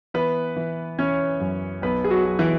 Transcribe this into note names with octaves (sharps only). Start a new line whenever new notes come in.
E3 B3 B4
E3
E3 C#4 C#5
F#2
B1 B3 B4
G#4
F#3 F#4
F#3
E3 E4